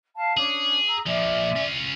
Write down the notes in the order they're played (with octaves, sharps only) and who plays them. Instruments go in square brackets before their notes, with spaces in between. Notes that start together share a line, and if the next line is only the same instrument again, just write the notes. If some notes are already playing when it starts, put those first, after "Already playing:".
[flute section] F5 A5
[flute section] C#4 D4 [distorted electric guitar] G#4
[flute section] A#5 E6
[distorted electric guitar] A#2 F3 [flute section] D5 E5 G#5
[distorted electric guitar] C#4 F4